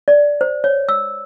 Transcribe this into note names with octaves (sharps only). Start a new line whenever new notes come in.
D5
C5
C#5
E6